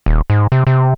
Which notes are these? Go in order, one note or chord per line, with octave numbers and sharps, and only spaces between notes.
D#1
G#2
C3
C3